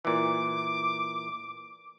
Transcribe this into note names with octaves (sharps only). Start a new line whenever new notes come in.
A#2 E3 D6